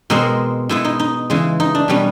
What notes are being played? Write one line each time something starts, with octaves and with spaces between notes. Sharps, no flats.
B2 G#3 C4 A#4
B2 G#3 B3 E4
D#4
D#4
C#3 E3 G#3
D#4
D4
B2 G3 B3 C#4